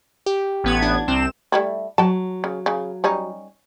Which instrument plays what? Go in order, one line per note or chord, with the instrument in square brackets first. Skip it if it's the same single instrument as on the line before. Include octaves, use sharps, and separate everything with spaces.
[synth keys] G4
[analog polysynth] A1 B3 G#6
[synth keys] D4
[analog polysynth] C2 C4 E7
[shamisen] G3 A3 E4
[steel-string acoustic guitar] F#3 [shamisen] F#4 A5
[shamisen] C#3
C#3
G3 C#4 D#4